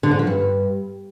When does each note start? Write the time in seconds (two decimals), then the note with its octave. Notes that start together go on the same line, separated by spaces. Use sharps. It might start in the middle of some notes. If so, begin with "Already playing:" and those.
0.03 D3
0.11 G#2
0.19 F3
0.27 G2